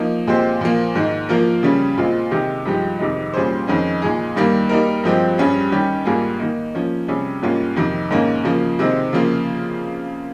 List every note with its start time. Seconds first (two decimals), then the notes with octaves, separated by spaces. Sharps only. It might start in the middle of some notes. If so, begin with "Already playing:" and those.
Already playing: F3 A#3 D#4
0.27 A#2 G#3 C4 G4 C5
0.61 A#2 F3 A#3
0.95 G#2 D#3 G#3
1.29 F3 A#3 F4 A#4
1.63 C#3 G3 C#4
1.97 A#2 G#3 C4 F4
2.31 C3 D#3 G#3 D#4 G4
2.65 G2 F3 G#3 D#4 G4
2.99 F2 C3 D#3 G#3 D#4
3.34 A#2 G3 C#4 G#4 C5
3.67 F2 D#3 G#3 C#4 G#4
4.02 A#2 G#3 D#4 G#4
4.36 G2 D#3 G3 A#3
4.69 G3 A#3 D#4 A#4
5.04 G2 F3 G#3 C4 G4
5.38 G2 G3 C#4 G#4
5.72 D#3 G3 C#4 G4
6.05 G#2 G3 A#3 F4 G#4
6.40 D#3 A#3 D#4
6.75 F3 A#3 C#4
7.08 C3 G3 C#4 G#4
7.42 G#2 G3 A#3 C#4 F4
7.76 F2 C3 D#3
8.11 G#2 D#3 A#3 C#4
8.44 C#3 F3 A#3
8.79 C3 D#3 G#3 C4
9.13 C#3 F3 A#3 F4